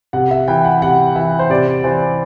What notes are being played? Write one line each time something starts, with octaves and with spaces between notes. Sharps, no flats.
C3 F#5
E5
E3 G5
F#5
C3 F#5
E3 E5
C5
C3 D5
E3 C5